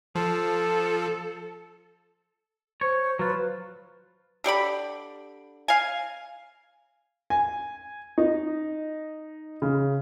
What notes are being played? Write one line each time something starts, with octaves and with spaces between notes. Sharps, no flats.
F3 A4
C5 C#5
F#3 F4 B4
D3 G4 D5 B5
F5 G#5
G#5
D#4
C#3